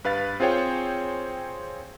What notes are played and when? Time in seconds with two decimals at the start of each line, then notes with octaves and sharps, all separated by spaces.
0.04 G2 B4 F5 A6
0.40 C4 F4 G#4 C5 C#5 G5